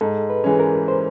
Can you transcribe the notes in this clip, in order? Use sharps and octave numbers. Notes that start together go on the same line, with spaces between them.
G#2 A4
B4
E3 G#3 C#4
A#4
C5